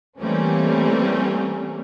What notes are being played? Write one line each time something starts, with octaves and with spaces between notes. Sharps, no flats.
E3 G3 A3 A#3 C4 C#4